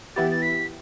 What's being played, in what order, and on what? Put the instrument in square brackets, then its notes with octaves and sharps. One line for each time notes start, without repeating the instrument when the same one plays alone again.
[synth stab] E3 B3 E4 G4 [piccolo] A6
[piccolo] A6
B6